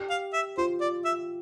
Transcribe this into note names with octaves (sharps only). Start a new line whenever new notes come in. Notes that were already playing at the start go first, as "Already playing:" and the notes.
Already playing: G4
F5
E5
F4 C5
D5
E5